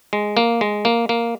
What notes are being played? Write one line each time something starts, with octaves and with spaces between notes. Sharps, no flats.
G#3
A#3
G#3
A#3
A#3